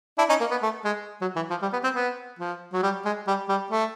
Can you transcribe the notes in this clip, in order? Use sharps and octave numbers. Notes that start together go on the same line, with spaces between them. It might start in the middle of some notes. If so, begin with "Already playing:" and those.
D4 E4
C#4 D#4
A#3
B3
A3
G#3
F#3
E3
F3
G3
B3
C4
B3
F3
F#3
G3
G#3
G3
G3
A3